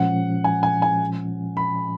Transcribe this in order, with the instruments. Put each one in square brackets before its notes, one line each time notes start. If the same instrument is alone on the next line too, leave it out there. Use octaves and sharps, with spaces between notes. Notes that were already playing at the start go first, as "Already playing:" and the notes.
Already playing: [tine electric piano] A#2 F3 G#3 C#4 [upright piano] F#5
[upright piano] G#5
G#5
G#5
B5